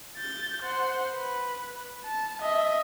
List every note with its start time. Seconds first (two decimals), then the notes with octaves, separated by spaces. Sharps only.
0.17 G6 A6
0.63 C5 F#5
1.15 B4
2.05 A5
2.42 D#5 E5